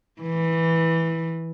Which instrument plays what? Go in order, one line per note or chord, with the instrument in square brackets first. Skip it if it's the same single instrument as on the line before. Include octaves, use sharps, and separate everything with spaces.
[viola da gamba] E3